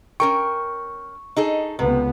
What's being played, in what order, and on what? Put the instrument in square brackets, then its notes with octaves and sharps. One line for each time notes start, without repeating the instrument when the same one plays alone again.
[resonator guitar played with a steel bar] C#4 A#4 G5 [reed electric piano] C#6
[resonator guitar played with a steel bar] D#4 G#4 A4
[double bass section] C#2 B3 [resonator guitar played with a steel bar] C3